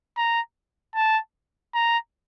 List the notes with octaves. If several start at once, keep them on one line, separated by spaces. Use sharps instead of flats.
A#5
A5
A#5